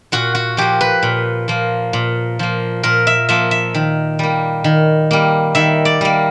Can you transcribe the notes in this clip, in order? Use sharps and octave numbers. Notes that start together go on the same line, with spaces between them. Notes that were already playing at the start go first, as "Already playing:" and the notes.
A#2 F#4
F#4
F3 A#3 G4
B4
A#2
F3 A#3
A#2
F3 A#3
A#2 A#4
E5
F3 A#3 E5
E5
D#3
G3 A#3
D#3
G3 A#3
D#3 E5
D5
G3 A#3